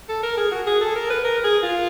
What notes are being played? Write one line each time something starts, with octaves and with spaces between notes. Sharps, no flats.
A4
A#4
G#4
F#4
G#4
A4
A#4
B4
A#4
G#4
F4